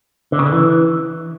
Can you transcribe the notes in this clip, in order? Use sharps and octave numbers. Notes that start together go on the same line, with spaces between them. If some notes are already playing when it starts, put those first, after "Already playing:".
D3
C#3
D3
E3